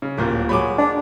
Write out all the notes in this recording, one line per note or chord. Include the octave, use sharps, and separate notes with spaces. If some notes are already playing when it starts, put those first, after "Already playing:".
C#3
D1 A#2 A3 A#3 G4
F#3 G#3 C#5 B5 D6
D4